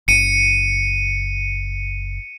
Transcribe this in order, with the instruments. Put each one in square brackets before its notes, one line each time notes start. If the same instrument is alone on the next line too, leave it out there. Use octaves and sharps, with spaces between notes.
[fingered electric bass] F#1 [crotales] C#7 D#7